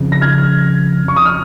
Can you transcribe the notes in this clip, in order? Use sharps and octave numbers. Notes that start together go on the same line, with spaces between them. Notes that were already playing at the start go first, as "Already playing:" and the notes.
Already playing: F2 C#3 F3
A#6
F6 G#6
C#6
D#6
F6